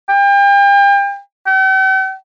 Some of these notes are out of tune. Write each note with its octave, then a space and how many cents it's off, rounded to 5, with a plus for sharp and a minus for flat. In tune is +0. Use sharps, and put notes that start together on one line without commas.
G5 +35
G5 -45